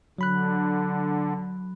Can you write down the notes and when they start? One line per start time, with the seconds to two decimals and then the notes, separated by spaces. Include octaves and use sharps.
0.18 D3 F#3 B5 F#6